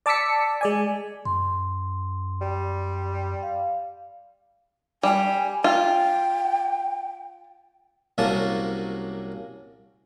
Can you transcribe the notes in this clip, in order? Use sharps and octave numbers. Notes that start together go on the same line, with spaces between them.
D5 A5 D6 E6 B6 C#7
G#3 D5 G#5
F#2 C6
G3
F5
G3 G#5
F4 G5
C2 C3 F#3 A#3 C#4 A5